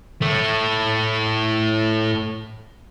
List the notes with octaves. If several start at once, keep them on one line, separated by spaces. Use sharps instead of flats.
A2 A3